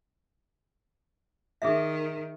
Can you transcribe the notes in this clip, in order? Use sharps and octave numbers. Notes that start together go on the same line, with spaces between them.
D#3 G#4 A4 E5